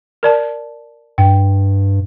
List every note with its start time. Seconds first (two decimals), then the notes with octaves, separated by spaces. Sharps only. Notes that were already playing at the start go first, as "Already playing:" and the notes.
0.23 A#4 D5 A5
1.18 G2 G5